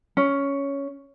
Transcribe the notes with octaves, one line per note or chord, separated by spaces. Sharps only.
C#4